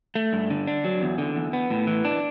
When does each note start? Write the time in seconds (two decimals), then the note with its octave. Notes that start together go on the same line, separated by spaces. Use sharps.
0.15 A3
0.33 G2
0.50 D3
0.67 D4
0.84 F#3
1.02 E2
1.18 D3
1.35 E2
1.53 B3
1.70 A2
1.87 E3
2.05 D4